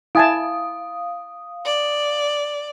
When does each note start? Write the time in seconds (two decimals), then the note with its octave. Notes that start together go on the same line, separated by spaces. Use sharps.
0.15 E4 F5 G#5 A5 D#6
1.65 D5